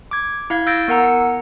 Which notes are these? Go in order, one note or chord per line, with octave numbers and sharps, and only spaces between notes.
D6 G#6
E4 F5 G#6
F5 E6 G6 A6 A#6 D7
B3 A#4 F#5 A#5 E6
C#7